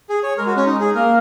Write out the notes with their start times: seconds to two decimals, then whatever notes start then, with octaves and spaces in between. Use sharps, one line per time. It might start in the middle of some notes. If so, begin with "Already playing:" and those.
0.09 G#4
0.23 C#5
0.37 G#3 A#4
0.46 F#4
0.57 C#4
0.66 D#4
0.80 G#4
0.94 A#3 A#4